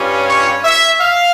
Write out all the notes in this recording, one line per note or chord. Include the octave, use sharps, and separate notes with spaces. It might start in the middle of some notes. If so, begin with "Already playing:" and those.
Already playing: G2 G3 C#4 F4
C#5
E5
F5